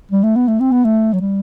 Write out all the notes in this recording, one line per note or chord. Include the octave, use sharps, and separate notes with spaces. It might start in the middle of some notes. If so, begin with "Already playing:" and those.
G3
A3
B3
A3
C4
B3
A3
F#3
G3